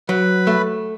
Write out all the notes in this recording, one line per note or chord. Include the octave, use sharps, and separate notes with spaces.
F#3 B4 B5
A3